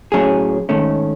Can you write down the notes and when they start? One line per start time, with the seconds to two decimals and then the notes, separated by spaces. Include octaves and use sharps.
0.12 A2 F#3 C#4 G#4
0.69 G#2 D#3 A3 C#4